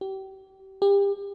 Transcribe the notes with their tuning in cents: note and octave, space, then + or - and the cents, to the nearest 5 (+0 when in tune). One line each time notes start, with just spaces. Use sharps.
G4 -30
G4 +30